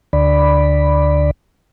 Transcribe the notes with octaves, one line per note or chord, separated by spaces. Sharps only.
D2 D3 D5 B5